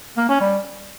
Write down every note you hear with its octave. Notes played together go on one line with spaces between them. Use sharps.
A#3
C#4
G3